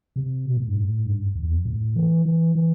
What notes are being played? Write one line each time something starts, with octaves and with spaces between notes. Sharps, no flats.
C3
B2
A2
G2
A2
G2
E2
F2
A2
E3
E3
E3